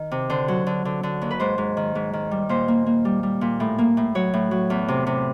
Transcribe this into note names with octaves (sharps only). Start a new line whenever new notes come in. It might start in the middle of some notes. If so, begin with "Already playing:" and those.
Already playing: D#3
C3
D3 C5
F#3
D3
D3
D3
D#2
B4
G#2 C5
G#2
D#3
G#2
D#3
G3
A#2 C5
A#3
A#3
G3
G3
A#2
A2
A#3
A2
F#3 C#5
A2
F#3
E2
C3
C3